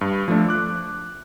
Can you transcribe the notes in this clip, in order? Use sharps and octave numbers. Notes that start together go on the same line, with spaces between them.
G2
F3 A3 D4
D6 F#6